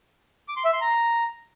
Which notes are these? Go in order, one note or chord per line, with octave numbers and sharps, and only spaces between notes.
D6
C6
E5
C6
A#5